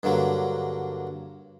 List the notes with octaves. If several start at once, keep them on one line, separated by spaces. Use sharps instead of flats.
G2 D3 F#3 A#3